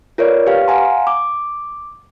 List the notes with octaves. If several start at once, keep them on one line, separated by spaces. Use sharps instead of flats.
F4 A#4 B4 C#5 D5
G4 B4 F5
F5 F#5 G#5 A#5 C6
D6